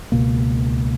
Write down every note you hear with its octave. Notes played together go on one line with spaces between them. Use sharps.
C#2 B2 A#3